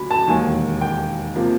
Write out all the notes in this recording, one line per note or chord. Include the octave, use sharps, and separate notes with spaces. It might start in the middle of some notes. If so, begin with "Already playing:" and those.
Already playing: D2 F#3 B5
A5
E1 D#2 D#3 G#5
G5
C3 F3 A#3